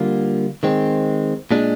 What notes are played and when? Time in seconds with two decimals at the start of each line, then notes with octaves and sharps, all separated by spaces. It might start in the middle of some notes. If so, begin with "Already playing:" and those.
Already playing: D3 G3 A#3 F4
0.63 D#3 G#3 C4
1.51 A#2 G#3 D4